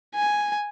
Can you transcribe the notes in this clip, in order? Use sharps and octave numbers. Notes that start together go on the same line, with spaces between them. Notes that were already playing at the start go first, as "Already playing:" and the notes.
G#5